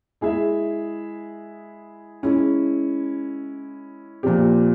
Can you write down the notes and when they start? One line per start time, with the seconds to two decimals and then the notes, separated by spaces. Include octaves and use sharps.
0.21 G#3 E4 G#4 E5
2.23 G#3 C#4 E4
4.23 A#2 F3 C4 G4